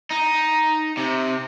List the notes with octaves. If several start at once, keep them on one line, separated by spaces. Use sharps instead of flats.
D#4
C3